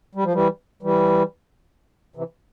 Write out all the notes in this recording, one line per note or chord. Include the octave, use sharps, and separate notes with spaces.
G3
F3
E3 G3
E3 G3
C3 E3